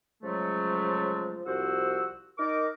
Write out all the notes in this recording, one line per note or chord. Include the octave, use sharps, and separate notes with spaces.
C#3 F3 F#3 G#3 A3
C2 F3 F#4 C5 F#5 E6
D#4 A#4 D6